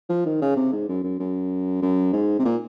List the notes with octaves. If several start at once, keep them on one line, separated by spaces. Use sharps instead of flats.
F3
D#3
C#3
C3
G#2
F#2
F#2
F#2
F#2
G#2
C3
A#2